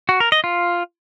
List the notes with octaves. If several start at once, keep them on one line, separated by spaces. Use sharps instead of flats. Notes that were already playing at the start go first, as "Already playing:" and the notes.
F#4
A#4
D#5
F4